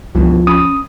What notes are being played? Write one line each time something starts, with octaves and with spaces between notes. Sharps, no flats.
C#2 G2 B2 E3 F3
C#4 B5 D#6